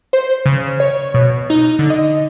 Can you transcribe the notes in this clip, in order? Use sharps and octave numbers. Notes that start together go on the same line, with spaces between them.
C5
C#3
C#5
B2
D#4
D3
D#5